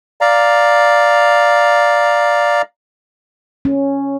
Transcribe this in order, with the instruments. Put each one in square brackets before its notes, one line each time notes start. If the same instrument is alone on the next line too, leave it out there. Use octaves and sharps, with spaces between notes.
[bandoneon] D5 F5 A#5
[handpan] C#4